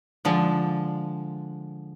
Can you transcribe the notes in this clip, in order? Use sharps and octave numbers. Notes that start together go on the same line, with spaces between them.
D3 F3 G#3